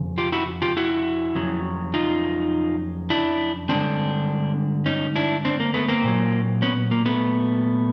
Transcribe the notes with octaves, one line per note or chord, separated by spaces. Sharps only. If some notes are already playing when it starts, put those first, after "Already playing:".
Already playing: F2 C#3
F4 G4
E4 F#4
F4 G4
E4 F#4
F2 C#3 F#3
D#4 F4
D4 E4
G2 D3 F3 G#3 C4 D4
C#4 D#4
D4 E4
C4 D4
A#3
A3 B3
A#3 C4
A#2 F#3
B3 C#4
A#3
A3 B3